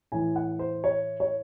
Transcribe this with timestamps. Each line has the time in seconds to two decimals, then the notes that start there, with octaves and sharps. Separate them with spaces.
0.12 A2 E3 G#5
0.36 F#5
0.59 C5
0.84 C#5
1.20 C#5